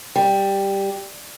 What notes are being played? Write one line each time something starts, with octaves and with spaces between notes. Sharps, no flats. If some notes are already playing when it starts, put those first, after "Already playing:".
G3 G5